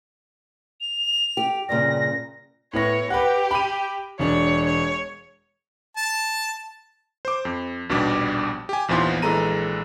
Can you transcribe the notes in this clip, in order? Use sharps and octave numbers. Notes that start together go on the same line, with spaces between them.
F7
G4
G2 A#2 C#3 A#6
A2 B3 C#5 A#6
G4 B4 F#5
B5 D#7
E1 D4 C#5
C#5
A5
C5 D6
F2
A#1 D#2 B2 G3 D4 D6
G4 G#5
A#1 D#2 E3 F3 B3 C6
A#1 E3 G#3 A4 A#5 D#7